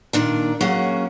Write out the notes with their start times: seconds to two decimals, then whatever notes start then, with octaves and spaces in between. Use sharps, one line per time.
0.13 A#2 D#3 D4
0.61 F#3 A#3 C#4 F#4 G#4